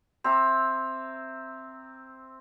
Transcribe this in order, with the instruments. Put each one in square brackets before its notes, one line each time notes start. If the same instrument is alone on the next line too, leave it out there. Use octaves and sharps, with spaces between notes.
[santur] C4 E5 A#5 D6